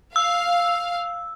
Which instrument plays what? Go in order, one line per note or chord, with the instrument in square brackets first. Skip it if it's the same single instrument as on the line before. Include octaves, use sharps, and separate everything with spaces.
[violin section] F5 [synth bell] E6